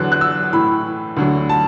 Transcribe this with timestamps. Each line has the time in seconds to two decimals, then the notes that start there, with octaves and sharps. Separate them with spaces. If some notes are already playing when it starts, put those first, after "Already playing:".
Already playing: E2 D3 F#3 F#6
0.12 F#6
0.21 E6
0.53 A2 E3 B5
1.17 D2 D3 F#3
1.49 A5